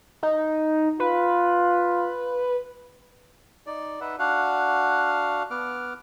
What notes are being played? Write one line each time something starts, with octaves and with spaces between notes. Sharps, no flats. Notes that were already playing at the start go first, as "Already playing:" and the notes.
D#4
F4 B4
D#4 D5
D#4 B4 E5 F#5
D4 F#4 F5 F#5
B3 F#5 D6 F6